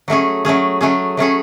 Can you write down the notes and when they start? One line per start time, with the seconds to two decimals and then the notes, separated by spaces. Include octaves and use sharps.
0.08 F#3 A3 C#4 G#4
0.45 F#3 A3 C#4 G#4
0.81 F#3 A3 C#4 G#4
1.17 F#3 A3 C#4 G#4